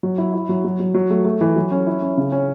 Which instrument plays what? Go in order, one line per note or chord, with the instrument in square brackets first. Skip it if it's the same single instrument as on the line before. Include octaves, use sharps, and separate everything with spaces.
[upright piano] F#3
E4
E4
F#3
F#3
F#3
F#3
A3
A3
E3
F#3
C#4
E4
C#4
C#3
C#4